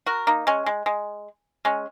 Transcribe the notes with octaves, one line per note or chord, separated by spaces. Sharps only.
F#4 A#4
A#3 D#4
G#3 C#4
G#3
G#3
G#3 C#4